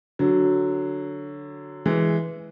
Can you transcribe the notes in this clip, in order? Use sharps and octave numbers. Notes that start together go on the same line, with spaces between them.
D3 F#3
E3 G#3